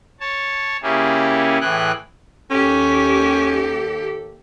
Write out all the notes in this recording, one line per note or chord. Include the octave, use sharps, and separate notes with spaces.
C#5 A5
C#3 A#3 C#4 E4 G4 G#4
A2 E3 G#4 G5 F#6
D#2 C#4 G4 A4